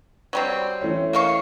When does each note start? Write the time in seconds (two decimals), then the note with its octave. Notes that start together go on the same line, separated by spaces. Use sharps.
0.33 F#3 G3 C4
0.81 E3 A3 C#4
1.13 A#3 F5 C#6